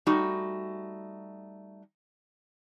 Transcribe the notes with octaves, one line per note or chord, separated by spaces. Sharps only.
G3 A3 D#4 F#4